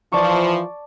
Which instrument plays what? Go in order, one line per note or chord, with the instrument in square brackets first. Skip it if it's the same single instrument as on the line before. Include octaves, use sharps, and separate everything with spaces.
[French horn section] E3 F3 [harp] D5 A5 C#6